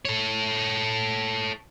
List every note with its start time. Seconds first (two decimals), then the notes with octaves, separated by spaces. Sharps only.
0.05 A4 C#5